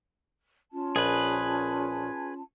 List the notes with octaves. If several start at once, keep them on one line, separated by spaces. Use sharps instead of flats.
C#4 F4 A5
A#1 G#4 B4